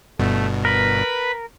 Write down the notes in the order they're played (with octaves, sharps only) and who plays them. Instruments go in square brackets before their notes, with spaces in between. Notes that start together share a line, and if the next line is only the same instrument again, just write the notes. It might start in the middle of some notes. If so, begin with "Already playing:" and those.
[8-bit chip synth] G1 G2 B2 [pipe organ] A3
[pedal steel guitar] A#4 [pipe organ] B4 B5